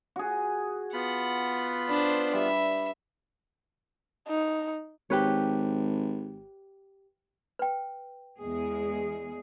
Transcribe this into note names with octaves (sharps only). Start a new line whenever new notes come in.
F#4 G#4
B3 F4 F#5 B5
D4 B4 C5
G3 E5
D#4
G#1 G4 B4 C#5
B4 G5
E2 G#3 G#4